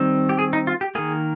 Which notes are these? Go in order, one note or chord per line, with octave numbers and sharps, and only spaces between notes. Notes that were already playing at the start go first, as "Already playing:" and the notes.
Already playing: D#3 G3 C4
G4
G#4
D#4
F4
G4
D#3 A#3 G#4